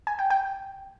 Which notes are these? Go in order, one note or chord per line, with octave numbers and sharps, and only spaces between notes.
G#5
G5
G5